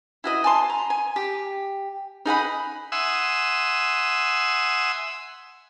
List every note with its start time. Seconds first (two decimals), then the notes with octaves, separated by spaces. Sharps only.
0.24 E4 F#4 D#5
0.44 G#5 A5 C6
0.70 A#5
0.90 G#5
1.16 G4
2.25 D#4 G#4 F#5 B5
2.92 E5 F#5 G#5 C6 D#6 E6